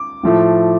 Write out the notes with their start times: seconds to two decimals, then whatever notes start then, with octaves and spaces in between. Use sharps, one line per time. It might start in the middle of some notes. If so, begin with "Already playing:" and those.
Already playing: D6
0.23 A2 F3 A3